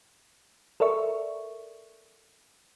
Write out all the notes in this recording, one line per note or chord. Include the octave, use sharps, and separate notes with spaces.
A4 A#4 D5 E5 C#6